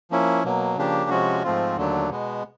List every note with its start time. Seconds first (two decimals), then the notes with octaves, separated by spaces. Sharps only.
0.11 F3 A#3 C#4 E4
0.44 B2 F#3 A#3
0.76 C#3 F3 A#3 D4 G4
1.10 C3 F3 G#3 C#4 F#4
1.43 G#2 F3 A3 C4 F4
1.77 D#2 D3 F#3 A3 D4
2.09 B2 G#3 B3